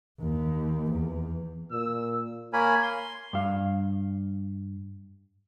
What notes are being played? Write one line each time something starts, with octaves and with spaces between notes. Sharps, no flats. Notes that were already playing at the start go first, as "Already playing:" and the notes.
D#2
E2
A#2 E6
A#3 A#4 C#5 G#5 B5
C6
G2 F5